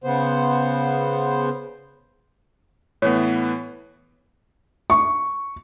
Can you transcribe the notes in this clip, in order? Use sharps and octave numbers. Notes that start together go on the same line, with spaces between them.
C#3 B3 C5
A2 E3 B3 C#5
C#6